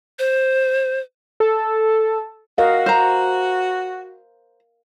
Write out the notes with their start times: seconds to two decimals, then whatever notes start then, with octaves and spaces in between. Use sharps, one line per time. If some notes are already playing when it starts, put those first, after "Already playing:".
0.19 C5
1.40 A4
2.58 F#4 A#4 D#5 F5
2.86 C5 A#5